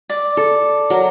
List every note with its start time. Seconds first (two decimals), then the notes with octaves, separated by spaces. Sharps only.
0.09 D5
0.37 A4
0.90 F#3 A4 A#4